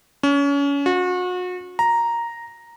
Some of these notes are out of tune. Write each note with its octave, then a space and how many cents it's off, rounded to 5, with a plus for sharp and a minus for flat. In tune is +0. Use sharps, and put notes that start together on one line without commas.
C#4 +30
F#4 -35
A#5 +0